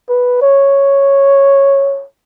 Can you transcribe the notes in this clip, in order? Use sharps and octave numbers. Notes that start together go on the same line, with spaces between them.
B4
C#5